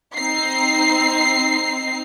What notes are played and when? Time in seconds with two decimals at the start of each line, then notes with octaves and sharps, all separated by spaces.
0.17 C4 D#4 C7